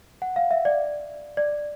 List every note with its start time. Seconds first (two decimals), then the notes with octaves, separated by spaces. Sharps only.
0.22 F#5
0.36 F5
0.51 E5
0.65 D5
1.37 D5